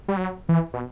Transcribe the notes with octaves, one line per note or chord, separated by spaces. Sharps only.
G3
F#3
E3
B2